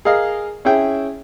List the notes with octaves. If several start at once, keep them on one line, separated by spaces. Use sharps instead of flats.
G#4 A#4 D#5 F5
C#4 E4 G#4 E5 G5